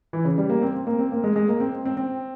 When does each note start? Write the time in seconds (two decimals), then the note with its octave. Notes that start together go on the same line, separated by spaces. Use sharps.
0.13 E3
0.25 C#3
0.38 G3
0.50 A#3
0.62 C4
0.75 C4
0.87 A#3
0.99 C4
1.12 A#3
1.24 G#3
1.36 G#3
1.48 A#3
1.60 C4
1.85 C4
1.97 C4